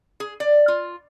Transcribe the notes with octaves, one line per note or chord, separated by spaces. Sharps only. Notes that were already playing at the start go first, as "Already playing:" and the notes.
G#4
D5
F4